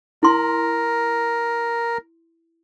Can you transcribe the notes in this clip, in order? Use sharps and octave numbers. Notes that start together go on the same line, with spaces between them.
E4 A#4 C6